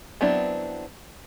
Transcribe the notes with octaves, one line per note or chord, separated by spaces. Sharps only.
F#3 B3 C4 D4 E4